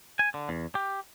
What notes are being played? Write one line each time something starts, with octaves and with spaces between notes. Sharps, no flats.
G#5
D3
E2
G4